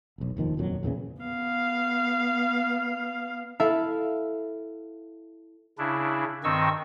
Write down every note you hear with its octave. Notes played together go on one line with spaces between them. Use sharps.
F1 B1
F1 D#2 D#3 F3
D#1 A#1 F2 F#3
E2 A#2 C#3 E3
B3 F5
E4 A4 E5 F5
C#3 D4 E4
G2 D#3 C4 D#5 C#6 E6